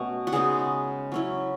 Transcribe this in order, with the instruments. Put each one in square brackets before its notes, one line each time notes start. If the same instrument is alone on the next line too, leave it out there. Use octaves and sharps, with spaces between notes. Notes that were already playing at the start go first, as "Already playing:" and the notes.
Already playing: [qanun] B2 A3 C#4
F#4
C#3 G#3 B3 D#4 G#4
F#3 C#4 E4